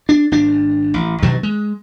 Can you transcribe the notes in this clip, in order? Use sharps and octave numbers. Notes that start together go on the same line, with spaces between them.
D4
G#1 D4
A1
G2 B2 D#3 F#3
G#3